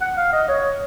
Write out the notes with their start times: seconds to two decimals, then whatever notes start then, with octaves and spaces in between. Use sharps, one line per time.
0.01 F#5
0.17 F5
0.33 D#5
0.48 C#5